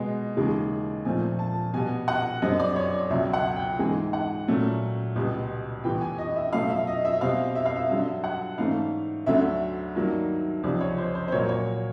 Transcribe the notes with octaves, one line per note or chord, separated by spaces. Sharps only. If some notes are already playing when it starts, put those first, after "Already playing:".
Already playing: B2 G#3 B3
D#2 C#3 E3 G#3
A#2 F3 A3 C4 G#5
A5
B2 G3 B3 G#5
F#5
F#2 D3 G3 C4 D#5
D5
C#5
D5
C#2 B2 F#3 E5
F#5
G5
G#2 E3 G#3 G#5
F#5
A#2 F#3 A3 C#4
C#2 B2 G3 B3
A2 E3 G3 B3 G5
G#5
D#5
E5
B2 F#3 A3 C#4 F5
E5
D#5
E5
B2 G3 C4 F5
E5
F5
E5
G2 D3 F#3 E5
F#5
G#2 E3 A3 C#4 F5
D2 D3 F#3 A3 E5
G2 D#3 F#3 A#3
C#2 C3 F3 D5
C#5
C5
C5
C5
A#2 F#3 A#3 C#5
C#5